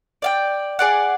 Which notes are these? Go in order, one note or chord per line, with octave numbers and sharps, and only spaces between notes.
D5 F5 G5
G#4 D5 F#5